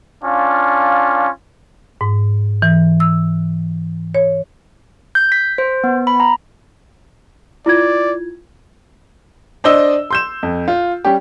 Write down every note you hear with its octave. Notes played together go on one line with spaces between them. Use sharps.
C#4 D4 F4 F5
G#2
E3
E6
C#5
G6
B6
C5
B3
B5
A#5
E4 F4 D5 G#6
D4 C5 D5 D#5 E6 G7
C6 G6 E7
F2
F4
G3 C#4 G4